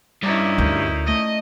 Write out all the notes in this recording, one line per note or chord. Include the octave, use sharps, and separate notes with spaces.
G2 C#4 D#4 E4 D5
D2 A#4 G6
A3 D#5